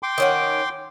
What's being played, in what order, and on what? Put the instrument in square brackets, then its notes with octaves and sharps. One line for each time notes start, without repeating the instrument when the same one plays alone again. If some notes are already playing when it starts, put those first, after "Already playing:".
[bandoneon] G5 C6 D6
[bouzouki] D#3 C#4 F#5